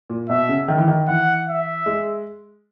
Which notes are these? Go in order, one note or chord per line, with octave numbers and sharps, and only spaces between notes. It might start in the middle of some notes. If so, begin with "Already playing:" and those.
A#2
B2 E5
C#3
D#3
E3
D#3
E3 F#5
E5
G#3